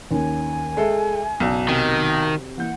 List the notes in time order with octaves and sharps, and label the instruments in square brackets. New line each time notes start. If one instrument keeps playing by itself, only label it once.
[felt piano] D#2 C#4 [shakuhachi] G#5
[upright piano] G#3 A4 [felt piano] E5
[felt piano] F#1 D5 [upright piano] B1
[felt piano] C3 [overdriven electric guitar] D#3
[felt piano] E3 A#3 G6 [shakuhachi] F#5